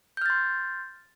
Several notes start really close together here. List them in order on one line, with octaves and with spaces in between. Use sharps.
G6 F6 A6 C6